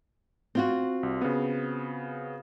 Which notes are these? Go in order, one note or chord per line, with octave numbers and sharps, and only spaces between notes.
C4 F4 F#4
C2
C#3 B3